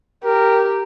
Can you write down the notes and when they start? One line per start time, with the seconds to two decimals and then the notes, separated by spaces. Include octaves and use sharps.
0.24 G4 A#4